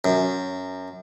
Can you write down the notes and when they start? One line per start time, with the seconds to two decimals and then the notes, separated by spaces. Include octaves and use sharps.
0.04 F#2